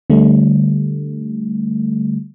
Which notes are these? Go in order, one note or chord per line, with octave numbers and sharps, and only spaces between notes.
D3 G3 A3